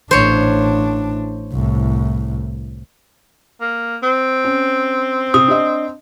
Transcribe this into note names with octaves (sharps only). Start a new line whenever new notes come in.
A1 D4 C5 C#5
C2 A2
A#3
C4
C#4
C3 D#6
D4 D#5